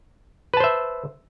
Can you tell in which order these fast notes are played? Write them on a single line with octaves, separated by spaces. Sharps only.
B4 A5 C5 E5